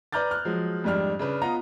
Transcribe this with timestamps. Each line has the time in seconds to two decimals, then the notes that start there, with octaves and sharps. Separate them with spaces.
0.12 B4 D5 A#5 F6 G6 A6
0.31 F6 F#6
0.45 F3 F#3 G#3
0.84 F2 G#2 G3 D4 F6
1.19 C#3 D4 B4
1.42 B3 F4 D#5 A#5